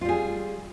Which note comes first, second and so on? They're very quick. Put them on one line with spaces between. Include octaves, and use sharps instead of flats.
F4 G3 G#4